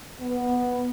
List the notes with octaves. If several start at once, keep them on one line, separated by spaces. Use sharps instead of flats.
B3